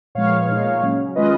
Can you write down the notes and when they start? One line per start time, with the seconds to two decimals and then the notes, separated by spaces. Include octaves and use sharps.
0.15 A#2 F3 G#3 B3 C#5 F5
0.49 A#2 G#3 D#4
0.82 C#3 F#3 C#4
1.16 D#3 G#3 C#4 F4 B4 D#5